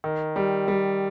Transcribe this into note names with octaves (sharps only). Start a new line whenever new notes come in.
D#3
G3
G3